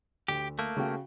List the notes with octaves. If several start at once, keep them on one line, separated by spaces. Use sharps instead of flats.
D2 G4
A3 A#3
C#3 F#4 G5